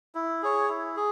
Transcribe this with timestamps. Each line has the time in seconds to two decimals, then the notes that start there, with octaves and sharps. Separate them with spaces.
0.15 E4
0.43 G#4 C#5
0.69 E4
0.97 G#4